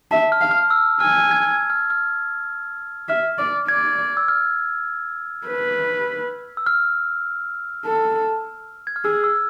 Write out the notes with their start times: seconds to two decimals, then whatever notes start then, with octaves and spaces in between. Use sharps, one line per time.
0.11 E5 A5
0.32 F6
0.41 F5
0.51 F6
0.70 E6
1.00 G#5 F6
1.31 G#6
1.51 G#6
1.70 F6
1.90 F6
3.09 E5 F6
3.38 D5
3.69 D5 G#6
4.17 E6
4.28 F6
5.47 B4
6.57 E6
6.66 F6
7.86 A4
8.87 G#6
8.96 F6
9.05 G#4 E6
9.24 E6